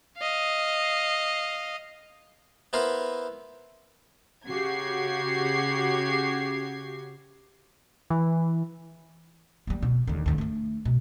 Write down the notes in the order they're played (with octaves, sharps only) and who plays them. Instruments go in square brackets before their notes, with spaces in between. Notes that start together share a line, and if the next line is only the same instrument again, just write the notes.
[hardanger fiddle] D#5 F5
[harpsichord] B3 E4 A#4 C5 E5 F5
[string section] C#3 F#4 G4 G#6 C7
[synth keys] E3
[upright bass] G3 A#3
B2
D#2 D3
D2 D3
A3 D4
B2